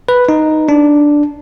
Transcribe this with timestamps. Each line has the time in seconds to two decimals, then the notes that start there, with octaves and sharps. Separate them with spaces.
0.09 B4
0.29 D#4
0.69 D4